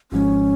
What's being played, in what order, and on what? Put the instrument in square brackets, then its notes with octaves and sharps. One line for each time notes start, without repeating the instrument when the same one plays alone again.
[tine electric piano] G#1 G#2 F3 G#3 [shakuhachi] C#4